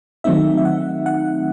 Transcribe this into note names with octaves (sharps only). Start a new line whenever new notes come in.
D#3 F#3 A3 C4 D#4 E5
E5
F#5
F#5